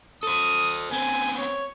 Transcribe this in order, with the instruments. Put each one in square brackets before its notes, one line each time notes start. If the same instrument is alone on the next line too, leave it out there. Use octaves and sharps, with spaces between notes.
[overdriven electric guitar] A4 C5 [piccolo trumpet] D#6
[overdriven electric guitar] B3 C4 [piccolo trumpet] G#5
[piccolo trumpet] C#5